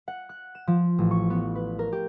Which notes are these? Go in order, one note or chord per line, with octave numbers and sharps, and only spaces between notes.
F#5
F#6
E7
F3
A1
C#6
B3
B4
A#4
G4